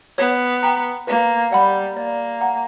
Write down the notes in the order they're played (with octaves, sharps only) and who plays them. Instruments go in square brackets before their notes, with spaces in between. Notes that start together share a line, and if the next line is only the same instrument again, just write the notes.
[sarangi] B3 [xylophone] C#5
[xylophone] G5 A#5
[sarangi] A#3 [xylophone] B4
[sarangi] G3 [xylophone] D5 F#5 B5
[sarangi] A#3 [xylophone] D5
[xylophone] F#5 A#5